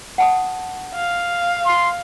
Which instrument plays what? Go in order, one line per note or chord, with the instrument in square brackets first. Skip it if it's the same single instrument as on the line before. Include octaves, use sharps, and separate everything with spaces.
[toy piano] F#5 A5 D#6
[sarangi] F5
[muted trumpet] C6